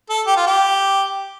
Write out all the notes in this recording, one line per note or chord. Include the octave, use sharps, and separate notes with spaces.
A4
G4
F4
G4